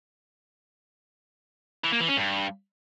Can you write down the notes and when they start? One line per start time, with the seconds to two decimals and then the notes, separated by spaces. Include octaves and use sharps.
1.84 E3
1.92 A#3
2.01 E3
2.09 C#4
2.17 G2